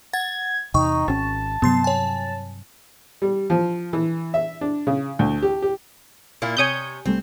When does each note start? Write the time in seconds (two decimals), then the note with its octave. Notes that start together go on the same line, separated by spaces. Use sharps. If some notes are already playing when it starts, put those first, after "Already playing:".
0.13 F#5 G#6 A6
0.74 E2 C3 D#4 G5 C#6
1.08 G#1 C#4 A5
1.62 G2 C3 F#3 B3 C6 C7
1.84 C#5 G#5
3.22 G3
3.50 F3
3.93 E3
4.34 E5
4.61 D4
4.87 C#3
5.19 D2
5.42 G4
5.62 G4
6.42 A#2 A#3 E4
6.57 C3 C#5 G#5 D#6 G6
7.05 C2 G3 A3 C4